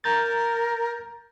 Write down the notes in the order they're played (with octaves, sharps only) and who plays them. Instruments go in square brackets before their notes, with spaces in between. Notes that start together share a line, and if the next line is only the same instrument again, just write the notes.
[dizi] A#4 [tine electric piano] A#5 G6 A6